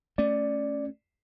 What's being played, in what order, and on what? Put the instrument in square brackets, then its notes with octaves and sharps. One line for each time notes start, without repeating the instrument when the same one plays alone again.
[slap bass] A3 C#4 [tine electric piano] D5